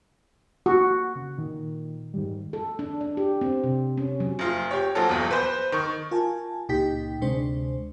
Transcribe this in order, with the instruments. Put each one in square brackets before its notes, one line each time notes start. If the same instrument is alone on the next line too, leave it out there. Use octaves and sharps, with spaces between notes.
[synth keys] A#3 [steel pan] F#4
[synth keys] C#3
A#2 D#3
G#2 D#3 G3
[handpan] A4
D4
D4
G4
C4
C3
C#4
F#3
[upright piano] F#1 F4 C6
G4 C#5
A#1 F3 F#3 F4 A4
D#1 B1 E2
B4 C5
D#3 C#6
[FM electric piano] F4 A#4 G#5 A5
C#2 A#2 D#4 G4 G5 B6
D2 C3 G#3 D4 C5